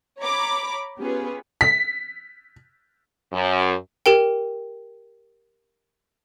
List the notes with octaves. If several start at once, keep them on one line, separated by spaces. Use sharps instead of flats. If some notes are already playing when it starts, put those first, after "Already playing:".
C#5 A#5 B5 D6
B3 C#4 F4 G4 G#4 B4
B6
F#2
G4 A#4 G5